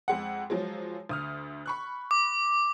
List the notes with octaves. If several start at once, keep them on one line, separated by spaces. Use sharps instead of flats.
F2 G#3 F#5
F3 F#3 G#3
D2 D#6 F6
B5 C#6 F#6
D6